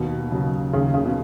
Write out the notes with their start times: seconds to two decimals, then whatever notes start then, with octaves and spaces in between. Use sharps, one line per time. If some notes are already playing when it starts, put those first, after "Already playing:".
Already playing: D#2 B2
0.31 C#3 F#3
0.73 D#2 C#3
0.94 C#3
1.05 B2